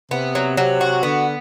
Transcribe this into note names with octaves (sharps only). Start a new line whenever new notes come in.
C3 B3
F#3
C3 F#3
F#4
D3 B3